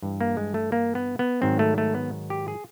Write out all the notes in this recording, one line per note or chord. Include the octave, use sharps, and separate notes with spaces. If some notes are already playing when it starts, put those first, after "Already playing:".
G2 E3 G3
A#3
G#3
A3
A#3
B3
B3
G#2 D#3 F#3 C4
A3
A3
B3
G4
G#4